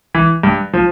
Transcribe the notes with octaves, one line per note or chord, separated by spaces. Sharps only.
E3
G2
F3